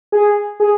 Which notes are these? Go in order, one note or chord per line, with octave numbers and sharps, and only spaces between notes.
G#4
G#4